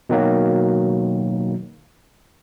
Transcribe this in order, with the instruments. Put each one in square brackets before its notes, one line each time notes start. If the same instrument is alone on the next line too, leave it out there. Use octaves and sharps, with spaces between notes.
[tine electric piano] B2 D#3 F#3 A#3